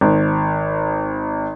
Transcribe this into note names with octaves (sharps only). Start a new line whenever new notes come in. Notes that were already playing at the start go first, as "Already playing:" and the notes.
G#1